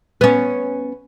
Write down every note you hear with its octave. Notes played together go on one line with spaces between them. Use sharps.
B3 C#4